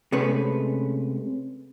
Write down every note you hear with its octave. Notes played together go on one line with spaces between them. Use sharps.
C3 G#3 A3 C#4 B4